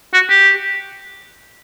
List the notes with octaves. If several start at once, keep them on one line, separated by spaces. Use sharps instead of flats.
F#4
G4